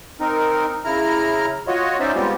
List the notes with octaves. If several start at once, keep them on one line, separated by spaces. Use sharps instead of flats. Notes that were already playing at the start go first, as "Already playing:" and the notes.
C4 D#4 A#4
C#3 E4 A#5 F6
F4 F#4 C#5 D#5
C#4 D#4 C5 D5 E5
G3 G#3 B3 C4 F4 G4